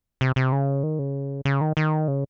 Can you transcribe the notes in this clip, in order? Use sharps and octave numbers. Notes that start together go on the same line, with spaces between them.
C3
C3
C#3
D#3
C#3
C#3
D#3
D#3
C#3